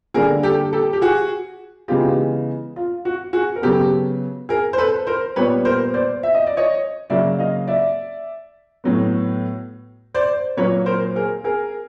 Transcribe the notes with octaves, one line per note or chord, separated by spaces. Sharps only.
D3 G3 A#3 G#4 A#4
G4 A4
G4 A4
G4
F#4 G#4
C#3 E3 G#3 B3 F4 G4
F4
F#4
F#4 G#4
A#4
C#3 F#3 B3 G4 A4
G#4 A#4
C5
A4 B4
A#4 C5
A#2 G3 B3 B4 C#5
A#4 C5
C5 D5
E5
D#5
D5
C#5 D#5
C#3 F#3 A#3 D5 E5
D#5 F5
D5 E5
A2 F#3 B3
C5 D5
A#2 F#3 A#3 B4 C#5
A#4 C5
G#4 A#4
G#4 A#4